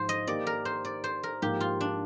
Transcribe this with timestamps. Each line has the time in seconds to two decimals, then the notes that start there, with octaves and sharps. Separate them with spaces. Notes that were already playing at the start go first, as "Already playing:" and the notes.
Already playing: G#2 F3 G4 C5
0.09 D#5
0.27 D#3 A#3 D#4 G4 D5
0.47 A#4
0.65 C5
0.85 D5
1.04 C5
1.23 A#4
1.42 G#2 F3 A#3 G4
1.61 F4
1.81 D4